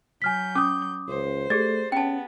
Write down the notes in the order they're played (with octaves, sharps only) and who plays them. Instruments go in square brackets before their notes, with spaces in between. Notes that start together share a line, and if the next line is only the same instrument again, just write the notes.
[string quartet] F#3 G6 [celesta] G#5 F6 B6
[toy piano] C#4 [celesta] D6 D#6
[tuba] C#2 [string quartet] C5
[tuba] A3 [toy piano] G4 G#4 D5 [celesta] A6
[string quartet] B3 [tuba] C#4 [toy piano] G5 A5